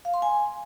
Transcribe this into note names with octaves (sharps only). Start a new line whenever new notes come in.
F5
C6
G#5